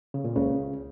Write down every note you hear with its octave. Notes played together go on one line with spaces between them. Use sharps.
C#3
A#2
C#2 C#3